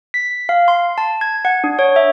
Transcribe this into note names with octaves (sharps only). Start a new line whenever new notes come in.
B6
F5
C6
A5
G#6
F#5
D4
C#5
E5